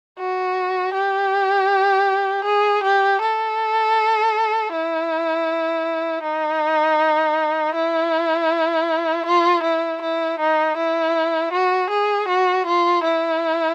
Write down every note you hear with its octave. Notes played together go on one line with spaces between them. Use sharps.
F#4
G4
G#4
G4
A4
E4
D#4
E4
F4
E4
E4
D#4
E4
F#4
G#4
F#4
F4
E4